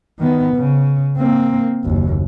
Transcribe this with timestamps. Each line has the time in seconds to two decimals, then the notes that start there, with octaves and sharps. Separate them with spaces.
0.19 D#3 B3
0.55 C#3
1.18 A#3 C4
1.84 F#1 D#2